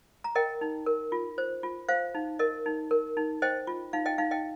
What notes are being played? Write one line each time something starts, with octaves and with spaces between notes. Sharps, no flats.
A#5
A#4 D#5 G5
D#4
A#4
F4
C5
F4
C5 F5
D#4
A#4 D#5
D#4
A#4
D#4
C5 D#5 G5
F4
D#4 F5
D#5 G5
D#4 F5
D#5 G5